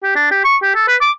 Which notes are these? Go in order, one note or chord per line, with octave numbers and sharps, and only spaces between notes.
G4
D4
G4
C#6
G4
A4
B4
D6